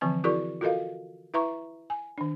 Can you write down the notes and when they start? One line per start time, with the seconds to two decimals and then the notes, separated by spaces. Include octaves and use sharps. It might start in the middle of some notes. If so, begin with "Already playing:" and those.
0.01 D3 E3 F3 C4 G#5 A5
0.24 E4 F#4 G#4 A#4 D5 C#6
0.61 F4 F#4 A4 A#4 D#5 F5
1.34 E4 B4 E5 A#5 C#6
1.90 G#5
2.18 D#3 D4